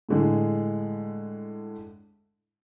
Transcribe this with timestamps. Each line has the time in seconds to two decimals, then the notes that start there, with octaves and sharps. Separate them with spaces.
0.09 A2 D3 G#3